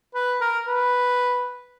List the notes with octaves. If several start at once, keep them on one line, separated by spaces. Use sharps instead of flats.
B4
A#4
B4